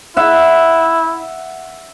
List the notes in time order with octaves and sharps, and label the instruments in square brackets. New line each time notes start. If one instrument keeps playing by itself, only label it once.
[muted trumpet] E4 [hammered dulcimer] E5 F#5